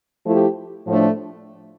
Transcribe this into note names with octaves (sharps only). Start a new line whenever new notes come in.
F3 A3 E4 G4
A2 F3 A3 D4